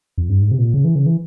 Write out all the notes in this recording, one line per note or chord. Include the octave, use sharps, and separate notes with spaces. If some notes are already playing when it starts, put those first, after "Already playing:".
F2
G2
G#2
C3
A#2
C#3
E3
C#3
E3